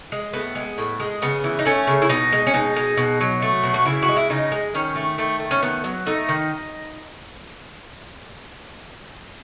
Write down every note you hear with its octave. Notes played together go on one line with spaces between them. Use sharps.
G#3
A2 B3
G#3
A2
G#3
C#3 B3
E3
D#4
A3 C#4
C#3
E4
B2 D#4
G#3
C#4
B2 D#4
G#3
B2
F#3
A3
B2
F#4
C#3 E4
F#4
G#3
E4
C#3 D#4
G#3
D#3 C#4
A3
D#3 A3
A3
C#4
D#3 B3
F#3
A3 D#4
D#3